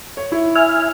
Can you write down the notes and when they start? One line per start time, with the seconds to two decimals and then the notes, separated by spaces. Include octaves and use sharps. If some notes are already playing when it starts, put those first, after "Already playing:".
0.17 C#5
0.32 E4 C#5
0.55 E5 G#5 F6